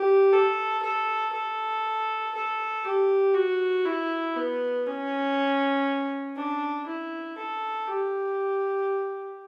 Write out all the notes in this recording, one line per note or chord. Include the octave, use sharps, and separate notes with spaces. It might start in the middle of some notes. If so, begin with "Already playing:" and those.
Already playing: G4
A4
A4
A4
A4
G4
F#4
E4
B3
C#4
D4
E4
A4
G4